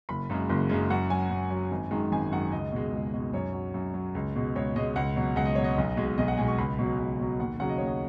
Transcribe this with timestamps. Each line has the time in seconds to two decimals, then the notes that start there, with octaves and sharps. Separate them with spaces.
0.09 F#1 B5
0.30 F#2 C#3 G#3
0.50 F#1
0.70 F#2 C#3 G#3
0.90 F#2 F#5
1.10 F#3 G#5
1.30 F#2
1.51 F#3
1.72 G#1
1.91 F#2 D#3 G#3
2.12 G#1 G#5
2.32 F#2 D#3 G#3 F#5
2.52 C#2 D#5
2.72 B2 G#3
2.93 C#2
3.13 B2 G#3
3.33 F#2 C#5
3.53 F#3
3.74 F#2
3.94 F#3
4.15 C#2
4.36 B2 G#3
4.56 C#2 C#5
4.76 B2 G#3 D#5
4.96 C#2 F#5
5.16 B2 F#3
5.36 C#2 F#5
5.46 D#5
5.55 B2 F#3 C#5
5.64 D#5
5.78 B1
5.97 B2 G#3
6.18 B1 D#5
6.28 F#5
6.37 B2 G#3 G#5
6.48 C#6
6.58 C#2 B5
6.79 B2 F#3
6.99 C#2
7.19 B2 F#3
7.39 D#2 F#5
7.60 C#3 F#3 F#5
7.69 D#5
7.78 D#2 C#5
7.87 D#5